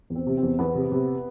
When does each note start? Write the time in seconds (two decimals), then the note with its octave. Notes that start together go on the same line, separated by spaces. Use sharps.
0.10 E2
0.15 C4
0.27 C3
0.37 C4
0.43 E2
0.59 E2 B3
0.75 C3
0.92 C3